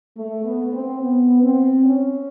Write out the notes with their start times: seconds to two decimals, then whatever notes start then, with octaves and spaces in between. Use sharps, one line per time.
0.17 A3
0.44 B3
0.72 C4
1.01 B3
1.43 C4
1.84 C#4